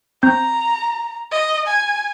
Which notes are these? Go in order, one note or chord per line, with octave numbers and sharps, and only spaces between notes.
C4 A#5 G6
D#5
G#5